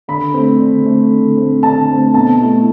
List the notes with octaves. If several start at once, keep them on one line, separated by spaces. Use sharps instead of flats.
D3 B5
A3 C4
D3
A3 C4
D3
A3 C4
D3 A5
A3 C4
B2 A5
A3 E4